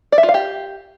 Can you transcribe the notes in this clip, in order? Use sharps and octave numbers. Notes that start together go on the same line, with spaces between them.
D5
E5
F4
F5
G4